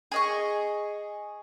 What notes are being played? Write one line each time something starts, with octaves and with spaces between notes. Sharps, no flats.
G#4 D#5 C#6